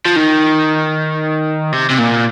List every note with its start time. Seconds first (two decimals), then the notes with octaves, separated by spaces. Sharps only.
0.05 F3
0.16 D#3
1.72 C3
1.90 C3
1.98 A#2